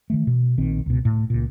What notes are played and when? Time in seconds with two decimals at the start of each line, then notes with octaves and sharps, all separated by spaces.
0.10 D#3 E3 A3
0.27 B2
0.58 A#1 D#3 C4
0.86 C#2 B2
1.05 A2
1.30 C#2 A#2